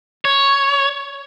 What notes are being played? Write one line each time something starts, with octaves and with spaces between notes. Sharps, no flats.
C#5